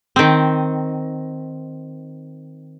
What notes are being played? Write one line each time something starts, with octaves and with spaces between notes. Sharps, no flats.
D#3 C4